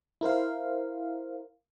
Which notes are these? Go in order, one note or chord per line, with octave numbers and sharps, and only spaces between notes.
E4 A#4 C5 F5